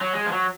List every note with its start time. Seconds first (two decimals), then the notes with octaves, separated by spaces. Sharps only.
0.01 F#3
0.13 G#3
0.26 F3
0.32 F#3